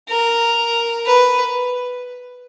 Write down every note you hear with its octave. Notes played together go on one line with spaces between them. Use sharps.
A#4
B4